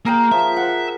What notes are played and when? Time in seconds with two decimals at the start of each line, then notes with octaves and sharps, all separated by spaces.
0.05 A#3 G#4 A#4 G5
0.32 F3 E5
0.56 C5 F#5